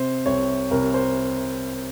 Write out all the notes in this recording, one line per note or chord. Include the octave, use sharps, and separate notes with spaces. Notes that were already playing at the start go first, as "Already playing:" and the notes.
Already playing: C3 C5
C2 C#5
C2 A#4
C5